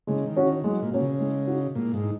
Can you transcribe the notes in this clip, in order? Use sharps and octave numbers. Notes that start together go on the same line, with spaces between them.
C#3 G#3
D#3
C#4 F#4
D#3
F#3 G#3
A#2
A#2 C#4 F#4
C#3
G#3
D#4 F#4
A#2 G#3
G#2
D#4